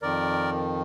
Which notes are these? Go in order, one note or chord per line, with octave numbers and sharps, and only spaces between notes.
F2 D#3 A#4 D5